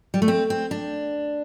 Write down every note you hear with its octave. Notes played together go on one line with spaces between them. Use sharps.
G3
A3
C4
C4
D4